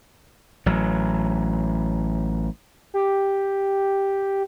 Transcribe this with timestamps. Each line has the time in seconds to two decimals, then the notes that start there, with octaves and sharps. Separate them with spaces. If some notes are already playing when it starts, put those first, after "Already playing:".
0.66 A1 F#3
2.94 G4